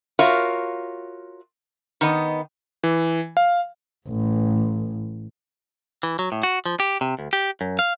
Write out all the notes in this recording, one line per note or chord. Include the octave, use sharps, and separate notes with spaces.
F4 F#4 A#4 C#5 E5 F5
D#3 B3 D#5
E3
F5
A1
E3
F#3
A2
F#4
F3
G4
C3
D2
G4
F#2
F5